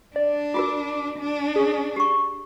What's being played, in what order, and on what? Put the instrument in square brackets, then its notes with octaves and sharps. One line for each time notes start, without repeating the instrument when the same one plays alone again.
[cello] D4 [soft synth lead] D5
[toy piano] F4 F#4 A#4 [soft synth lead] D6
[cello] D4
[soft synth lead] G#4
[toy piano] G4 C#6